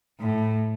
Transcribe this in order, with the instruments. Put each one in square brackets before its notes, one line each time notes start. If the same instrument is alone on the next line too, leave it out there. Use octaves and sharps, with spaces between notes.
[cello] A2